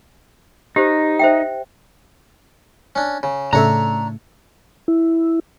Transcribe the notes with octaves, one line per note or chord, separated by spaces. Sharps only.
D#4 G4 C5
C5 E5 G5
C#4 D4
C#3
A2 C#3 A3 D4 C#5 E5 A#5
E4